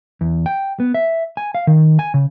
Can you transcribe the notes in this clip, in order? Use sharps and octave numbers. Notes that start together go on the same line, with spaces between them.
E2
G5
B3
E5
G#5
F5
D#3
G#5
C#3